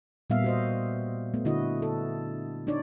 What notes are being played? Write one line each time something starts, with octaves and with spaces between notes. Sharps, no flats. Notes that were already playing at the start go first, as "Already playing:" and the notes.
A#2 G3 A#3 B3 E5 F5
F#4 C5 D#5
A3 B3
D3 E4 F#4 D#5
A4
D4 D#4 C#5 D5